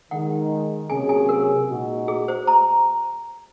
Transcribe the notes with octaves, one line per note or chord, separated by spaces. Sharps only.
D#3 G#3 D#4 F#5
C3 F#3 A#3 C#4 G#4 G#5
G#5
A#4
A#2 G#3 D#4 F#4
G#4
C5
A#5